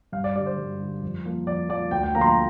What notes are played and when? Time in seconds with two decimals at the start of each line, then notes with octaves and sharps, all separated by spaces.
0.12 G2 F5
0.24 D5
0.36 D3 G3 D5
0.46 C5
0.58 G2
0.80 D3 G3
1.02 F2
1.25 F3 A#3
1.47 F2 D5
1.69 F3 A#3 D5
1.91 D2 G5
2.03 G5
2.14 D3 F3 A#3 A#5
2.21 C6
2.26 A#5